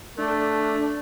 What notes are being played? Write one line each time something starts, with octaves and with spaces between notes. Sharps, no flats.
A3 D4 A4